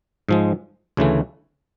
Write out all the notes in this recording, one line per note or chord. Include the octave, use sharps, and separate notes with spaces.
G#2 F3 G#3
D2 C#3 E3 A3